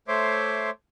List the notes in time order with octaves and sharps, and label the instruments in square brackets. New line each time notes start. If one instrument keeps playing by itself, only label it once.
[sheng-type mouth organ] A3 C5 C#5 E5 C6 D6